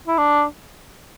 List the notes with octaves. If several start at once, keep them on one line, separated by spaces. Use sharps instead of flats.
E4
D4